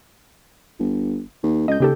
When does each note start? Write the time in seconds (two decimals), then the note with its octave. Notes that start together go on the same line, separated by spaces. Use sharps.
0.79 G1
1.43 D#2
1.68 C#2 D#5 G6
1.80 D#2 C#3 G4 A4